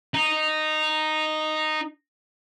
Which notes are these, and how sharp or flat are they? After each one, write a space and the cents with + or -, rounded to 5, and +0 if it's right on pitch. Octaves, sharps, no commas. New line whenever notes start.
D#4 -10